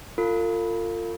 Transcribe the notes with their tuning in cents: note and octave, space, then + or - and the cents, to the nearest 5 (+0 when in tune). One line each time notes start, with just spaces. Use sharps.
F4 +0 A4 +45